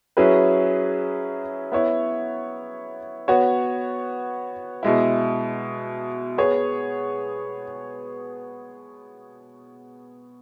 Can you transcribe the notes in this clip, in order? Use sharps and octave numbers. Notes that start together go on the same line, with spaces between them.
F#3 C#4 E4 G#4 B4
B3 E4 C#5
B3 F#4 C#5
B2 G#3 E4
B3 G#4 C#5